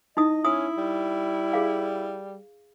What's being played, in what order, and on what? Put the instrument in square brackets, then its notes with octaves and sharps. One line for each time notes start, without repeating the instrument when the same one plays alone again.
[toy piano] D#4 E4 D#6 [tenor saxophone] D#5
[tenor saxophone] C#4 [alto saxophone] E4 [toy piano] D#6
[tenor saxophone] G3
[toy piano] G#4 F5